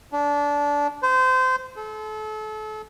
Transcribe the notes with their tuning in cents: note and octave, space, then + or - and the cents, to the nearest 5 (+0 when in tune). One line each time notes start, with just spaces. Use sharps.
D4 -20
C5 -25
A4 -35